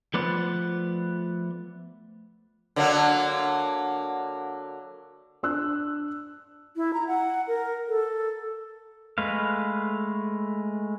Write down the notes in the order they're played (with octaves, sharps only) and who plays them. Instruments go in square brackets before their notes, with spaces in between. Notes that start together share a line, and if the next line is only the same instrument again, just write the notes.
[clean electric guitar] F3 A3 B3 B4 C5 D5
[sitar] D3 F#3 A#3
[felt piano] D4 E6 F#6
[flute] E4
A#5
F#5
A#4
A4
[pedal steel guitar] G#3 A3 B4 F5